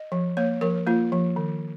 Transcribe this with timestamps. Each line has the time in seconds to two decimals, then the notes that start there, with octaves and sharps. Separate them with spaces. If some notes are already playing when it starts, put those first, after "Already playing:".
Already playing: D#5
0.12 F3
0.37 A#3 C#5
0.61 F3 A#4
0.87 A#3 F4
1.12 F3
1.36 D#3